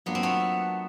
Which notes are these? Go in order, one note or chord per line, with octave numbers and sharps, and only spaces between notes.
F#3 A#3 B3 D4 F4
C4
A3 B3